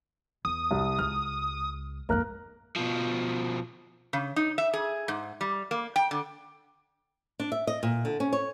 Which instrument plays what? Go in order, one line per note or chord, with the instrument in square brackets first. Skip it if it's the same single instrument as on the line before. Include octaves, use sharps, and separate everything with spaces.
[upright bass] E2 [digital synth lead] D#6
[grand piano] C2
[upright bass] C#2 [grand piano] F6
[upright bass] F2 G#2 [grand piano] A#3 A#4 F#6
[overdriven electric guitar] B2 F3
[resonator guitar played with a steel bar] C#3
D#4
E5
G#4
G#2
G3
A#3
G5
D3
[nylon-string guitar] D4
E5
D#5
A#2
D3
C#4
C#5